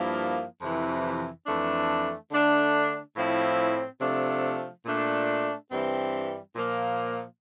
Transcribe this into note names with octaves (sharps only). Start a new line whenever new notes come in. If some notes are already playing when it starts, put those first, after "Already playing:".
Already playing: G2 F3 A#3 E4
F2 C3 E3
F2 E3 A3 D4
D3 A3 D4
A2 F3 C4 E4
C3 F3 A3 D4
A#2 A3 D4
G2 E3 G3 C4
A#2 F3 A#3